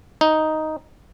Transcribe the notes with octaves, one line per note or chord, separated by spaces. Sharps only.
D#4